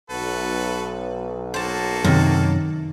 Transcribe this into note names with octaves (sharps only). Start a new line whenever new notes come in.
B1 F#4 A4 B4
A#3 F#4 A4 C5 A5
F#2 C3 D#3